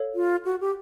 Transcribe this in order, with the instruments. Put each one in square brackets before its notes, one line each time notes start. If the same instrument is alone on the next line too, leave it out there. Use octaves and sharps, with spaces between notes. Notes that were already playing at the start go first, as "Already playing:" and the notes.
Already playing: [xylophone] A4 C#5 F5
[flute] F4
F#4
G4